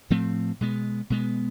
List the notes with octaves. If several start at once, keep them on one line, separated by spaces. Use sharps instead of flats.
A2 F3 A3 C4
B2 G#3 B3
B2 G#3 B3